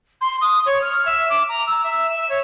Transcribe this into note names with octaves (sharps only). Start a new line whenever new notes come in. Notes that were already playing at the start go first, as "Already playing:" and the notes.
C6
D#6
C#5
F6
E5
D6
A#5
E6
E5
E5
C#5